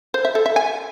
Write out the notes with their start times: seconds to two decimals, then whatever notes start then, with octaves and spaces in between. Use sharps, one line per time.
0.14 C5
0.25 E5
0.35 A4
0.46 E5
0.56 G#5